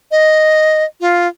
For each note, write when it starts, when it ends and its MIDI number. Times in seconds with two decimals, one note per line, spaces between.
0.11 0.84 75
1.01 1.28 65